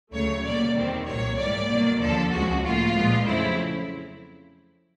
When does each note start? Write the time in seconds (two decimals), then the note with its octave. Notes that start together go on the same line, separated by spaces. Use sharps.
0.12 D2 C#3 F#3 A3 C#5
0.44 B2 G3 A#3 D5
0.75 E2 C3 D#3 G3 C4
1.06 C2 A#2 F#3 A#3 C#5
1.38 G#2 E3 G3 A#3 D5
1.69 C2 B2 F#3 A#3
2.00 D#2 D3 F3 A4
2.31 C#2 C#3 F3 G#3 F#4
2.63 A2 F3 A#3 F4
2.94 A#2 F3 G#3 B3
3.25 F2 C#3 F#3 A3 C4 E4